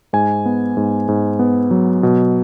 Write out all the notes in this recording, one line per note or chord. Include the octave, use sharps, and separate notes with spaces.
G#2 G#5
B3
G#2
G#2
B3
F#3
B2